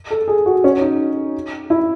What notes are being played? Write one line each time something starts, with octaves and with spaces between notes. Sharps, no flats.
A4
G#4
F#4
C#4
D#4
E4